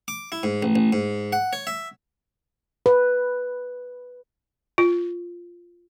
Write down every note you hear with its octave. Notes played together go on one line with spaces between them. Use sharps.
D6
E4
G#2
A1
A1
G#2
F#5
C#5
E5
B4
F4